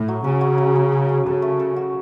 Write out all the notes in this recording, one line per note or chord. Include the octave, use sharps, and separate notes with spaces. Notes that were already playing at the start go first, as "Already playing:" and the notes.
Already playing: A2
F#3
C#3 C#4
F#3
F#3
F#3
C#4
C#4
C#3 A4
A3
A4
F#4